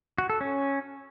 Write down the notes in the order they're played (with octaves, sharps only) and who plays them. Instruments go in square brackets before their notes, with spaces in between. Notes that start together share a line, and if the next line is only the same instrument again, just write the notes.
[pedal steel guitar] F#4
A4
C#4